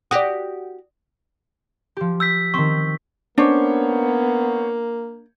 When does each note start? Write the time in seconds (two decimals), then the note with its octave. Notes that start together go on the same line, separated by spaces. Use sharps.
0.11 F#4 G4 D5 D#6
1.97 F3 G4
2.20 E6 G6 B6
2.54 D#3 C4 C#6
3.38 A#3 B3 C#4 D4 C5 C#5